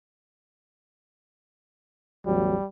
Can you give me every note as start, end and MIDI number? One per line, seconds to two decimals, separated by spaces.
2.26 2.56 33
2.26 2.56 40
2.26 2.56 54
2.26 2.66 55